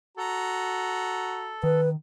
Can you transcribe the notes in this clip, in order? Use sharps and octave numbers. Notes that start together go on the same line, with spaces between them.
F#4 A4 A#5
D#3 B4